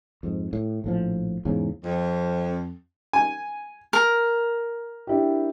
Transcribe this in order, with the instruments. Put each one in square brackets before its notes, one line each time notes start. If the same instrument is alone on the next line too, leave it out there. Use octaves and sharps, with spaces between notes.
[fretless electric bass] F2 G#2
A2
A#1 A2 F3
E2 G#2 C#3
[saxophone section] F2
[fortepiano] G#5
[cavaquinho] A#4
[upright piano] D4 E4 G4